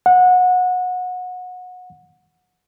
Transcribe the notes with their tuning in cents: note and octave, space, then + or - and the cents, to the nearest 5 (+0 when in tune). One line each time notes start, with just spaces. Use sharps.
F#5 -25